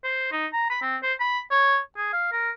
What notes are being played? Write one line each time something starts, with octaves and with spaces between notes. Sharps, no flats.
C5
D#4
A#5
B5
C4
C5
B5
C#5
G#4
F5
A#4